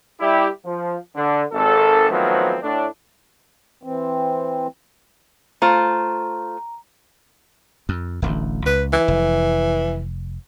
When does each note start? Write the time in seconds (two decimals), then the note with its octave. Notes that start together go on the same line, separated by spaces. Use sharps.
0.20 G3 E4 G4
0.65 F3
1.16 D3
1.52 G#1 A4
2.10 D#3 F3 F#3 A3 B3 C4
2.63 A2 D4
3.83 E3 C4
5.62 A3 F4 C5 A#5
7.89 F2
8.22 D1 A1 D2
8.66 C#2 B4
8.93 E3
9.08 F1